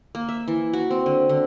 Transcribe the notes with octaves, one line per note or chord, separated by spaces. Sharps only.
A#3
E5
E3
F#4
C4
D3
D3